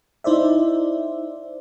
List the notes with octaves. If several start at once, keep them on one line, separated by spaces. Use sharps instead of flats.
D#4 E4 C5 D5 E5